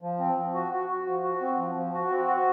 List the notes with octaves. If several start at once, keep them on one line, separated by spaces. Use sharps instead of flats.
F3
C4
F3
F#4
F#4
F#4
F3
F#4
C4
F3
F3
F#4
C4
F#4